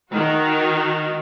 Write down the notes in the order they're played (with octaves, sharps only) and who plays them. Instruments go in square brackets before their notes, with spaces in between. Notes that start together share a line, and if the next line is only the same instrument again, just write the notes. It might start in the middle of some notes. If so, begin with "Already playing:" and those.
[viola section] D#3 F#4